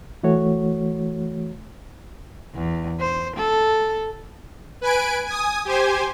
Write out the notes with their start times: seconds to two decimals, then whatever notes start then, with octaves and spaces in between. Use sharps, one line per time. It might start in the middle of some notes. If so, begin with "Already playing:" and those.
0.23 E3 A3 F#4 C#5
2.55 E2
3.00 C5
3.36 A4
4.81 B4 G#5 D7
5.26 G#5 D#6
5.65 G4 C5 G#5